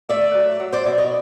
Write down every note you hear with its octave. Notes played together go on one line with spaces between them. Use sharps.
A3 D5 E5
F#3
F#3
C5 D5
B2 D5 E5
C#5 D#5